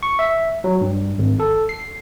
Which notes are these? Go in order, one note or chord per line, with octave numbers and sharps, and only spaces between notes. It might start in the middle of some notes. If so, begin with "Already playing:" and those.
C#6
E5
F#3
G2
G#1
A4
C7